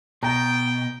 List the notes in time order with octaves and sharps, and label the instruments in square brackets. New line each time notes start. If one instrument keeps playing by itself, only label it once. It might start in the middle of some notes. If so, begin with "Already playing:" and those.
[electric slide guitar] B2 [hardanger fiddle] G5 [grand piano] A#5